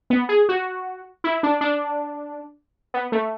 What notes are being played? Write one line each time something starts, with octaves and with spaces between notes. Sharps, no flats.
B3
G#4
F#4
E4
D4
D4
B3
A3